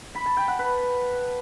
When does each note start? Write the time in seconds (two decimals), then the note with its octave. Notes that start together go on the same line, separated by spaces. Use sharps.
0.15 B5
0.26 A5
0.37 G5
0.48 F#5
0.59 B4